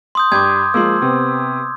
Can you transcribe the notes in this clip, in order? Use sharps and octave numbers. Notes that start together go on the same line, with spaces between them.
C6 D#6 G6
G2 D6 G6 G#6
F3 G#3 A#3 C6 E6
C3 B3 C4